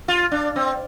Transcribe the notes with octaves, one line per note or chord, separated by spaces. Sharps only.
F4
D4
C4